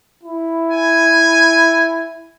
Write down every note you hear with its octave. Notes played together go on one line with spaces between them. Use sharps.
E4
G#5